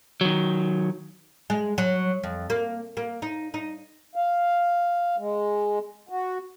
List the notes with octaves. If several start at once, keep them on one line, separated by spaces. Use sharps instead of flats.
D#3 F#3
G#3
F#3
F2
A#3
A#3
D#4
D#4
F5
G#3
F#4